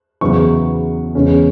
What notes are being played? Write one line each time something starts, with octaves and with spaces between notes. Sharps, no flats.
E2 C#3 F#3 B3 E4 C#6
E2 C#3 G#3 C#4